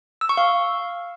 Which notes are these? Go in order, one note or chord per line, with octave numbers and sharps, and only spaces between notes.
E6
C#6
F5